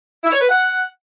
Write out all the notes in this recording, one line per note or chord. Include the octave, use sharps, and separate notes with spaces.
E4
C#5
B4
F#5